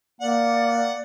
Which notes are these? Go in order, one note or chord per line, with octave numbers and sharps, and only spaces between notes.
A#3 D5 F#5